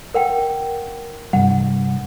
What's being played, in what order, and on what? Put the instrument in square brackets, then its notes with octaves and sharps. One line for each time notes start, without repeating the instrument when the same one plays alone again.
[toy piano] A#4 F#5 G5
[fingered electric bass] G2 C3 G3 [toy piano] F#5